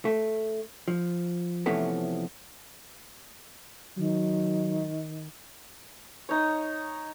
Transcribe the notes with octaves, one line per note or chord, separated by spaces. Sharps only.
A3
F3
C3 E3 F3 A3 B3 C#4
D#3 F#3
D#4 C#5